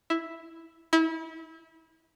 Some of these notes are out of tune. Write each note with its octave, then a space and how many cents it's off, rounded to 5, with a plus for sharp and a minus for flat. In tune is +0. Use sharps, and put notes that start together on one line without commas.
E4 +0
E4 -30